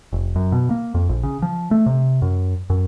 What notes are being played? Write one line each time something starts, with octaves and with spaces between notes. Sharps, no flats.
F1
F#2
B2
A#3
F2
A#1
C#3
F3
A3
C3
F#2
F#2